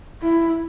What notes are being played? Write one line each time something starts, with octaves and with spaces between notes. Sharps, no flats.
E4